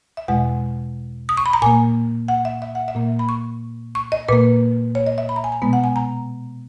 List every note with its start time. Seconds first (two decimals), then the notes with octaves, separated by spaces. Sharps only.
0.17 E5
0.28 E2 B2 G#3 F#5
1.29 D#6
1.37 C#6
1.46 B5
1.53 A#5
1.62 A#2 A#3 G#5
2.28 F#5
2.45 E5
2.62 E5
2.75 F#5
2.88 E5
2.95 A#2 A#3
3.19 B5
3.29 C#6
3.95 C#6
4.12 D#5
4.29 A#2 A#3 B4
4.95 C#5
5.06 D#5
5.18 E5
5.29 B5
5.36 A#5
5.44 G#5
5.52 A#5
5.62 B2 G#3 B3
5.73 F#5
5.84 G#5
5.96 A#5